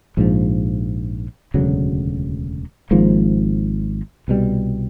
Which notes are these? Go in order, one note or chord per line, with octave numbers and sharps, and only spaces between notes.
A#1 G#2 F3
E1 D2 C#3 F#3
G#1 G#2 F3 A#3
C2 B2 G3